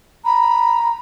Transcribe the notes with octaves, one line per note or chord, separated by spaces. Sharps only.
A#5 B5